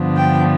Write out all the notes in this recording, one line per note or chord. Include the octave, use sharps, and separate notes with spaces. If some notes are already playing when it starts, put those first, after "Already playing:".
Already playing: G2 D3 F3 B3 D4
G5